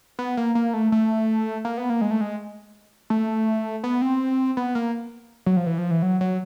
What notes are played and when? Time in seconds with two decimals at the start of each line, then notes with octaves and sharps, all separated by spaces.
0.19 B3
0.37 A#3
0.55 A#3
0.74 A3
0.92 A3
1.65 A#3
1.78 B3
1.90 A#3
2.01 G#3
2.11 A3
2.21 G#3
3.10 A3
3.84 B3
4.02 C4
4.57 B3
4.75 A#3
5.46 F#3
5.57 F3
5.66 E3
5.78 F3
5.91 E3
6.02 F#3
6.21 F#3